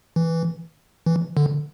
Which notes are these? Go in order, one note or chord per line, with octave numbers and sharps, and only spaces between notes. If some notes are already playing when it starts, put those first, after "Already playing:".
E3
E3
D3